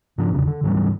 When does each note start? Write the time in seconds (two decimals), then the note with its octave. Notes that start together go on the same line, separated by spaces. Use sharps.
0.18 G#2 F3 C4 D4
0.34 A1 E2 C#3
0.47 D3
0.63 G#2 E3 F#3 G3